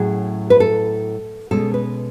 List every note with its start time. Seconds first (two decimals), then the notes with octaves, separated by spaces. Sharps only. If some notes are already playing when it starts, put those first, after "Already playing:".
Already playing: A2 F#3 A3 C#4 G#4
0.50 B4
0.60 A4
1.51 B2 G#3 C#4 A4
1.74 B4